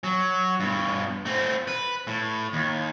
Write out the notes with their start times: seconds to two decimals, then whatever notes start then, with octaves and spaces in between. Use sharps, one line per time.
0.04 F#3
0.60 G2 B2
1.26 A3 C4
1.67 B4
2.07 A2
2.53 D#2